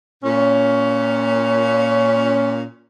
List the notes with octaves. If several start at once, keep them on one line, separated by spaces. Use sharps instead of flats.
A#2 C#4